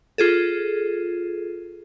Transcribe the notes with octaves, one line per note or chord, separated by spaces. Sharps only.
F4 G#4 A4